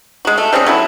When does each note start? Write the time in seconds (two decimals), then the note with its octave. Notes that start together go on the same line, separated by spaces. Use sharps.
0.25 G#3 F#4
0.38 A3
0.53 G3 C4 C#4 G#4
0.66 F#3 A3 E4